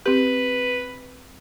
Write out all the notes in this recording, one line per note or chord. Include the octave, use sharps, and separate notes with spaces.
C4 G4 B4